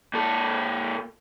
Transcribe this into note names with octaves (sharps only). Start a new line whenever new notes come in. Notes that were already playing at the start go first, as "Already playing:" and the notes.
A#2 A4